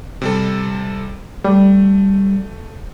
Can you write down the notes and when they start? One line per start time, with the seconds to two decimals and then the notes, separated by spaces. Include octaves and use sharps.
0.22 C3 G3 A4
1.45 G3 A3